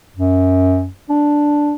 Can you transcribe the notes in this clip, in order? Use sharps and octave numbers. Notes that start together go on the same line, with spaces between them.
F#2
D4